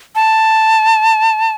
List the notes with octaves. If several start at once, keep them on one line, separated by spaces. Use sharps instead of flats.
A5